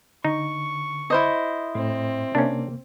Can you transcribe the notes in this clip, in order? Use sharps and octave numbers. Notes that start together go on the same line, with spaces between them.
D3 D#4 C#6
E4 C5 D#5
A2 C4
C3 A#3 C#4 D4